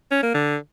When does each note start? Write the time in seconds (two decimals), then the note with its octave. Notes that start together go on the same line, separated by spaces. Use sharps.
0.11 C#4
0.23 A#3
0.34 D3